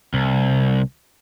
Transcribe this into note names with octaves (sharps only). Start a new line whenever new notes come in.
C2